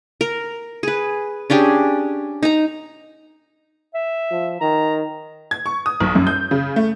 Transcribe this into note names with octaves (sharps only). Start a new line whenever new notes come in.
A#4
G#4 B4
C#4 D4 G4 G#4
D#4 A#5
E5
F3
D#3 A#5
G#6
C#6
D#6
B1
F#2
G6
C#3
A3